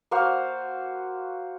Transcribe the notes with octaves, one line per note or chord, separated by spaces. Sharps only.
A#3 F#4 C5 F5